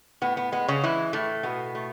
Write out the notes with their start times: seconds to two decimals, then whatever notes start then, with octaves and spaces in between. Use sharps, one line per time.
0.22 A2 B3
0.37 B3
0.52 G#3 B3
0.68 C#3 C#4
0.84 E3 G#3 E4
1.13 A2 A3
1.43 B2 B3
1.75 A3